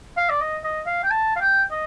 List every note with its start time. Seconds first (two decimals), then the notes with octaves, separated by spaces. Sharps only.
0.17 F5
0.29 D5
0.41 D#5
0.64 D#5
0.86 F5
1.03 G5
1.10 A5
1.36 F5
1.40 G5
1.71 D#5